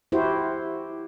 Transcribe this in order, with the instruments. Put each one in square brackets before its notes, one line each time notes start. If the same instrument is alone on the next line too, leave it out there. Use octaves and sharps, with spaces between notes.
[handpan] E4 F#4 G4 C5